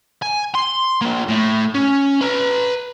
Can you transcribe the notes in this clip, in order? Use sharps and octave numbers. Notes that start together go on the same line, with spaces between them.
G#5
C6
A#3 D4
A2
C#4
B4 A#5